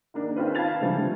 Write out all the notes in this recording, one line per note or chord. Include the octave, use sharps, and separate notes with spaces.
D#3 A#3 D4
D#3 C4 C#4 F4 B4
F5 A5 B5 G#6 A6 F7
D3 E3 F3 G3 A3 C4